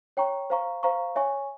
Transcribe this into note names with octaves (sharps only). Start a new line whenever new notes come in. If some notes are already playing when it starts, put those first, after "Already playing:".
C#5 G5 A#5 C#6
C5 F5 A#5 C#6
C5 F5 A#5 C#6
C#5 E5 G#5 C#6